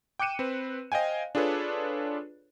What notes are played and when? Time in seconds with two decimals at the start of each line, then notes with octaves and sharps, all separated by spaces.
0.19 G5 D6 F#6 C#7 D#7 E7
0.39 C4 B4
0.92 C5 D#5 F5 G5 G#5
1.35 D4 F4 G#4 A4 B4 C#5